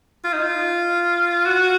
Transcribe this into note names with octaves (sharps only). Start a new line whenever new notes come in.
F4
D#4
F4
F#4